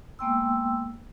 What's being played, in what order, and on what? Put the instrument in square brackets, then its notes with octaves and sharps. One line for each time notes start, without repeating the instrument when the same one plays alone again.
[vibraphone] G#3 A#3 B3 G5 C6 E6